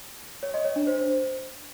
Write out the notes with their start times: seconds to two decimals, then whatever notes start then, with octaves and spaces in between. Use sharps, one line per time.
0.43 C#5
0.54 D#5
0.65 C#5
0.76 D4
0.87 C5